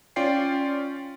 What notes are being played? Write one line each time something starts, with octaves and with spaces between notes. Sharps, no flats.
C#4 F4 D5 G5 C7